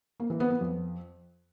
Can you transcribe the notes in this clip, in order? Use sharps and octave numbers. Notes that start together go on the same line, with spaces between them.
A#3
E3
B3
B3
F2